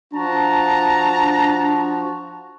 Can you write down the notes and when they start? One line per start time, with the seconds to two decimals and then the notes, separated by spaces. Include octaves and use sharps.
0.13 F3 D4 F#4 A5 A#5